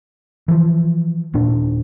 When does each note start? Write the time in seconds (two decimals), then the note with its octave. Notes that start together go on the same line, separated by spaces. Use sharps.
0.48 E3 F3
1.34 D#1 A#2 D4